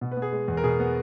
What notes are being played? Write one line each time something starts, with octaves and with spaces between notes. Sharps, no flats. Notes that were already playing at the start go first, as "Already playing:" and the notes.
B2
B4
B3
G#4
G#3
E2
A#4
B2 G#4
B3